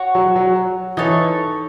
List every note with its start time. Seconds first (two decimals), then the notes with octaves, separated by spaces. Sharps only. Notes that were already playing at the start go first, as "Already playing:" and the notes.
Already playing: F#4 C#5 F#5
0.15 F#3
0.36 F#3
0.97 E3 D#4 A4 C#5